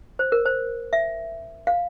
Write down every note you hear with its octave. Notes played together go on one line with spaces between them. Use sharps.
C5
A#4
C5
E5
F5